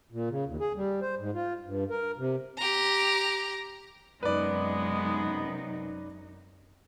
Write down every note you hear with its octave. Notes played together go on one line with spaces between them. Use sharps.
A#2
C#3
D#2
G#4
G3
C5
G#2
F4
G2
A#4
C3
G4 A#5
F#2 C3 G#3 B3 D#4 B4 D5